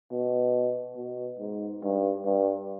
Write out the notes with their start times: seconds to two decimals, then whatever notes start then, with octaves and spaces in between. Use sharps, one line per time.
0.12 B2
0.97 B2
1.39 G#2
1.83 G2
2.25 G2